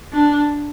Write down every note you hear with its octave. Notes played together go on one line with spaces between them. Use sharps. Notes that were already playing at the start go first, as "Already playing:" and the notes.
D4